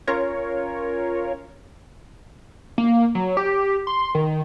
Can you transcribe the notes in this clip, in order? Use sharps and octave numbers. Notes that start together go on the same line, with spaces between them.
C#4 F4 A#4 C#5
A#3
F#3
G4
C6
D#3